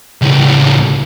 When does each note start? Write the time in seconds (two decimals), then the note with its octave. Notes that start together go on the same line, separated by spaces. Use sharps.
0.22 C#2 A2